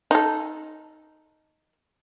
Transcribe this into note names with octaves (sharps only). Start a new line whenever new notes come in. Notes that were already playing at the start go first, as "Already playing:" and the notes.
D#4 A4